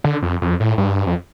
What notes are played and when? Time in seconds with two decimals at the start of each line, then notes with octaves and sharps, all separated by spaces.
0.04 D3
0.22 F2
0.42 F2
0.60 A2
0.78 G2
1.07 F2